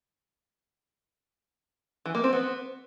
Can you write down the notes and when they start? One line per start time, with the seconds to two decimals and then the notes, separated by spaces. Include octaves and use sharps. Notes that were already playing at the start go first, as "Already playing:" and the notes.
2.06 E3
2.15 A#3
2.24 C4
2.33 B3